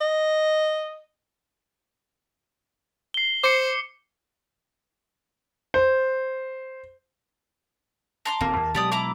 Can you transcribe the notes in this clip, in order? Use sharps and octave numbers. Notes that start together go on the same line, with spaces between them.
D#5
C7 G7
C5 D6 C#7
C5
A5 A#5 C6 D6
D#1 D#2 A#3 C4
D#2
B2 F#3 G#3 G4 D5 D#6
E4 A#5 D6